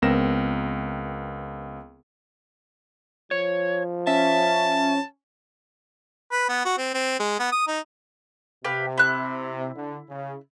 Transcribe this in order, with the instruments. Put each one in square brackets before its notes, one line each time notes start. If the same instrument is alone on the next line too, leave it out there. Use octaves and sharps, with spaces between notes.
[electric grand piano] C#2 B3 C4 A#4 A#6 E7
[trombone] F3 [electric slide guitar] C#5
[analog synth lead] C#4 [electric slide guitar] E5 [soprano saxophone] A5
[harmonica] B4
B3
F#4
C4
C4
G#3
B3
D#6
D#4
[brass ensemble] C3 [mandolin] G4 B4 F5
[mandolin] E4 F#6
[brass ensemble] D3
C#3